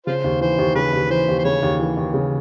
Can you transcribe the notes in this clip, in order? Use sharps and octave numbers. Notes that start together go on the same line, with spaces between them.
C#3 F4 C5
D#2
E3 C5
D#2
C#3 B4
D#2
E3 C5
D#2
C5
C#3 C#5
D#2
E3
D#2
C#3